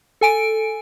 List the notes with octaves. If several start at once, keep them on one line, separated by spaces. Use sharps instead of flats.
A4 G#5 D7